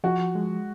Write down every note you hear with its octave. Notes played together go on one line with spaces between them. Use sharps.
F3 F#4
G#3